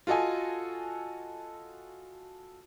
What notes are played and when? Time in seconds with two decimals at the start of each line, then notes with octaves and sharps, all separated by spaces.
0.07 F4 F#4 A4 D#5 G#5